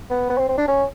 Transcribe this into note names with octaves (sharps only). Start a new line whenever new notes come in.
B3
B3
C4
C4
D4
C#4